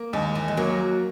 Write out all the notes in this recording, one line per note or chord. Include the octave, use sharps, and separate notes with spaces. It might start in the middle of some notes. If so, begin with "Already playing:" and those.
Already playing: A#3
D#2 G#3
E3
G#3
F#3 A#3